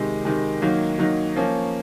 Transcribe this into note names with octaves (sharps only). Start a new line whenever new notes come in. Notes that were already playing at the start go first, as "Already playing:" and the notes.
Already playing: C3 D#3 G#3
C3 D#3 G#3
D#3 F#3 A#3 D#4
D#3 F#3 A#3 D#4
F3 A#3 C#4